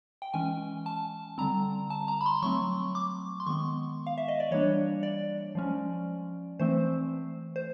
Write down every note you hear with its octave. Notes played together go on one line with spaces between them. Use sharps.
G5
E3 G#3 C#4 G#5
A5
D3 G3 C4 A#5
A5
A#5
B5
C6
F#3 A3 C4 C#6
D6
C6
D#3 G#3 B3 C#6
F5
E5
D#5
D5
E3 G3 A#3 D4 C#5
D5
F3 G#3 C#4
E3 A3 C4 C5
C5